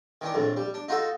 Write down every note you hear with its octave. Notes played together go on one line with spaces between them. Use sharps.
D#3 E3 D4
A#1 F2 A2
G3
D4
D#4 F4 F#4 A4